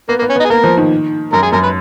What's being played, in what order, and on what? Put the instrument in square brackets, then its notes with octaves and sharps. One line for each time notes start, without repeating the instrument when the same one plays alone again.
[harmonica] A#3 [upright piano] B3
[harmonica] A#3
[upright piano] B3
[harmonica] C#4
[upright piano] B3 [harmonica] D#4
[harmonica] G#4
[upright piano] A#3 [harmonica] A#4
[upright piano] F3
D#3
[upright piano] F#2 [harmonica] A#4
[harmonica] G#4
[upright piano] F#2 [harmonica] A#4
[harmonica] B4